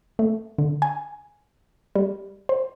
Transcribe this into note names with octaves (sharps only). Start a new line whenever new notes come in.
A3
D3
G#5
G3
C5